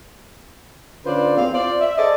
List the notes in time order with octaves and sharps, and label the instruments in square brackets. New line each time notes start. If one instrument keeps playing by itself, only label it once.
[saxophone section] D3 C#4 F4 B4 C5 D5
E2 C4 F5
F4 C5 D5
E5
G#4 A4 C5 D5 D#5